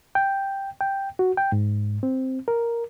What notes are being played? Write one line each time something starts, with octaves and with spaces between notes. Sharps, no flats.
G5
G5
F#4
G5
G#2
C4
A#4